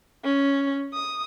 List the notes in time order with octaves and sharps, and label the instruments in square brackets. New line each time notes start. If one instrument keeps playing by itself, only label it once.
[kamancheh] C#4
D#6